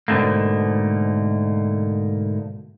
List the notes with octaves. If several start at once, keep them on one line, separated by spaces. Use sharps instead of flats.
G#2 B2 D3 A3 A#3